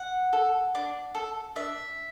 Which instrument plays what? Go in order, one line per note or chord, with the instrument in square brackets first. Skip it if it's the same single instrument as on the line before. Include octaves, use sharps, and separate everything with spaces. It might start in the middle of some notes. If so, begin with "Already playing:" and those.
Already playing: [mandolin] F#5
A4
D4
A4
D4 E5